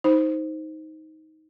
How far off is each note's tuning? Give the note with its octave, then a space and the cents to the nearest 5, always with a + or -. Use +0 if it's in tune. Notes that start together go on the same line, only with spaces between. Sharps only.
D#4 +15 C5 +0 B5 +0